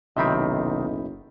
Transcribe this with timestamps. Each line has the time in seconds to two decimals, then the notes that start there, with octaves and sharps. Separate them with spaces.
0.17 F#1 B1 C3 D#3 C4 D#5 E5 B5